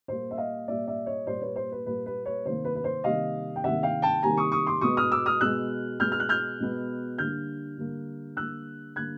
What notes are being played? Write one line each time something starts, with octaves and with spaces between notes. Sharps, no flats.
A#2 G3 A#3 C5
E5
D#5 F5
A#2 G3 A#3 D5 E5
D5 E5
C#5 D#5
A#2 G3 A#3 C5 D5
B4 C#5
C5
B4
A#2 G3 A#3 B4
B4
B4 C#5
C3 D#3 G3 A#3 C5
B4
B4
C5
C3 D#3 G3 A#3 D#5 F5
G5
C3 D#3 G3 A#3 E5 F#5
F5 G5
G5 A5
C3 D#3 G3 A#3 G#5 A#5
C#6 D#6
C#6 D#6
C6 D6
B2 G#3 B3 C#6 D#6
D#6 F6
D6 E6
D#6 F6
B2 G#3 B3 E6 F#6
B2 G#3 B3 F6 G6
F6
F#6
F6 G6
B2 G#3 B3
D3 G3 A#3 F6 G6
D3 G3 A#3
D3 G3 A#3 E6 F#6
D3 G3 A#3 F#6 G#6